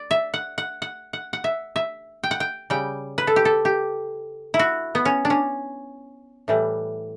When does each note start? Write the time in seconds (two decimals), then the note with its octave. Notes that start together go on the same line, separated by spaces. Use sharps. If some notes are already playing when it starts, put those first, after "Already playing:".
Already playing: D5
0.11 E5
0.34 F#5
0.58 F#5
0.82 F#5
1.13 F#5
1.33 F#5
1.44 E5
1.76 E5
2.24 G5
2.31 F#5
2.40 G5
2.70 C#3 G3 G5
3.18 B4
3.27 A4
3.36 G4
3.45 A4
3.65 G4
4.54 E4
4.59 F#4
4.95 B3
5.05 C#4
5.25 D4
5.30 C#4
6.48 A2 E3 G3